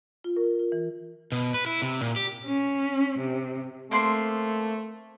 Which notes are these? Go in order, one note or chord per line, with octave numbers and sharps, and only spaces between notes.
F4
A#4
F4
E3
B2
B4
E4
C3
A#2
G4
C#4
C3
A3 A#3 C4 C6